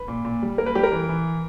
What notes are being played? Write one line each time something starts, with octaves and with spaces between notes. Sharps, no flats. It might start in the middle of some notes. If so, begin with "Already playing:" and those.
Already playing: B4
A#2
A#2
G3
A#3 A#4
B4
G3 G4
A#4
E3
E3